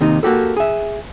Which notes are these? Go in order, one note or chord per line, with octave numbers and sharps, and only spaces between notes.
D#2 C3 D#4
A#3 F#4 G4 A4
G#4 E5